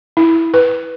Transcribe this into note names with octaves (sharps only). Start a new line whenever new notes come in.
E4
B4